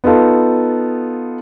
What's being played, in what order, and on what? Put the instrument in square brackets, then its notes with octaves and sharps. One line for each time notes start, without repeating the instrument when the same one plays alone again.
[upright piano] B3 D#4 F4 A4